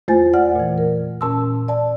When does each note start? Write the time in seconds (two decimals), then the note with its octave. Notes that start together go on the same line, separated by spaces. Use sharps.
0.08 E2 A3 F4 C5 G#5 A6
0.33 F2 D5 F#5 F6
0.55 A#2 E3
0.78 A#4
1.21 A#2 C#4 A5 C6 E6
1.68 D5 A5